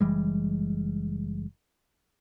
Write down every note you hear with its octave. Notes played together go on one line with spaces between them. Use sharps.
F#1 E3 G3 G#3